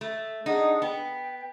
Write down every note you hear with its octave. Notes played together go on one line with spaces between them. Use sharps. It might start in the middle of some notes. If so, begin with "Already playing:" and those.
A3
D4 D#4 G#4 F#5
B3 G5